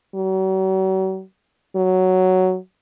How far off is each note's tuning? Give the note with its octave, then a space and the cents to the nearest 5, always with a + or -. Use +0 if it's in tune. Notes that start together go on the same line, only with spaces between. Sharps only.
F#3 +40
F#3 +5